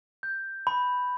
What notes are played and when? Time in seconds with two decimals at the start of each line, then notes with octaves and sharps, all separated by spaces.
0.23 G6
0.67 B5